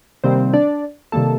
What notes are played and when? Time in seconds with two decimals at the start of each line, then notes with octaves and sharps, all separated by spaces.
0.24 C3 D#3 G3 A#3 C4 C5
0.54 D4 D5
1.12 C3 D#3 G3 A#3 A4 A5